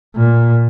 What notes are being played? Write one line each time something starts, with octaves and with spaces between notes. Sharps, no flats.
A#2